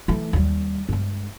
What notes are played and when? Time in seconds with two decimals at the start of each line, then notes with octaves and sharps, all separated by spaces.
0.08 E3 A3
0.33 D#2 G3
0.89 G2 G#3